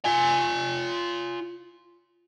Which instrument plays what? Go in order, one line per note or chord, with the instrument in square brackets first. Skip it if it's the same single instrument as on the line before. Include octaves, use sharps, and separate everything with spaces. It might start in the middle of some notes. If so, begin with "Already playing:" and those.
[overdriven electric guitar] F4 G#5